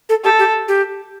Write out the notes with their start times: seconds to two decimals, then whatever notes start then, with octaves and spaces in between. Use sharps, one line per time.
0.09 A4
0.24 G4 A4
0.39 G4
0.68 G4